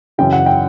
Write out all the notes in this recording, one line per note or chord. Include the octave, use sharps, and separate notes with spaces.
F#2 C#3 E3 G5
F#5
G5